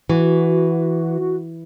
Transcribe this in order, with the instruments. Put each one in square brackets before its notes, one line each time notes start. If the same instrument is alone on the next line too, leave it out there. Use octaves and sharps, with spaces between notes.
[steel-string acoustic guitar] E3 [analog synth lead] F#4